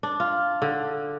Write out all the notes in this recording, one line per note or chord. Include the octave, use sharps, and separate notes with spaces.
D4
F4
D3